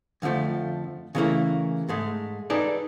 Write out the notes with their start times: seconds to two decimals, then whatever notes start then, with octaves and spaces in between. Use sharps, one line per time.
0.22 F2 D3 D#3 F3 A3
1.15 C#3 E3 G3 A3 A#3 E4
1.88 G#2 G#3 A3
2.50 D#4 G#4 A4 B4 D5